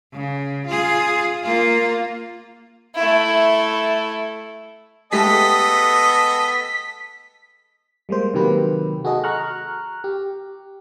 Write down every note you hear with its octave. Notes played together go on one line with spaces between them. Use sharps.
C#3
F4 G#4
A#3 F4
A3 E4
G#3 A3 B3 G4 A4 D#5 B6
G3 G#3 A#3 C5
C3 D#3 F#3 A#3 G4 B4
F#4 G#4 A4 D#5
A#5 C#6 F6 F#6
G4